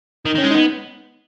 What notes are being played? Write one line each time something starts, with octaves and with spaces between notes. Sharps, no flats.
D#3 D#4
D#3 C#4
G#3
B3 D#4